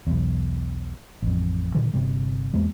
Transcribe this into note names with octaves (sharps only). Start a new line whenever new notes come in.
B1 E2
A1 F2
A#2 D3 D#3 G3
G1 C3 G3
E2 G#3 A#3